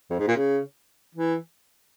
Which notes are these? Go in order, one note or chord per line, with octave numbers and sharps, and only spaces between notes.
F2
G#2
A#2
C#3
E3